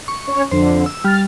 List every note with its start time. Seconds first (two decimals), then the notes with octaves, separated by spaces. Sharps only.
0.08 C#6
0.27 C#4 C#5
0.51 F2 D3 C5
0.86 E6
1.05 G3 F6 A6